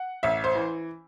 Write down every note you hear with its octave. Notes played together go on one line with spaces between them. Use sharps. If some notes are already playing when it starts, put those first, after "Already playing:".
Already playing: F#5
A1 E5
C5
E3